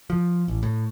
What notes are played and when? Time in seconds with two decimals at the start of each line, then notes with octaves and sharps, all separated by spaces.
0.10 F3
0.48 A1
0.63 A2